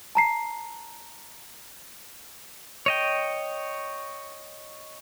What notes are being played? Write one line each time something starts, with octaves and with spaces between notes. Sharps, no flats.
A5 A#5 C7
C#5 D#5 G5